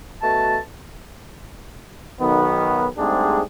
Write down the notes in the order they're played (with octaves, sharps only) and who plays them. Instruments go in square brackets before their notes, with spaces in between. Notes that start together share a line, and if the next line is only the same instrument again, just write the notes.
[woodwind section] B2 A3 F#4 A5
[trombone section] B1 D#3 B3
G#2 G3 A3 C4 D4 G#4